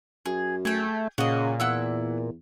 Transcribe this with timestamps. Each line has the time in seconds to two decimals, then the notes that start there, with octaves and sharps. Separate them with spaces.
0.26 F#2 G#4
0.65 A3 G#4 G5
1.18 A#2 C#3 F#4 D#5
1.60 E2 E4 F#5 E6